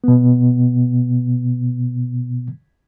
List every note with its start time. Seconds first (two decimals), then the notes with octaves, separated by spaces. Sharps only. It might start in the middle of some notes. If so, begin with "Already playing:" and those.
0.04 B2 B3